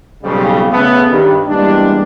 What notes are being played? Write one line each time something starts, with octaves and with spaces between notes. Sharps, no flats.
B1 F2 C#3 G3
C#3 A3 B3
G2 D#3 G3
E2 G3 G#3 A#3 D4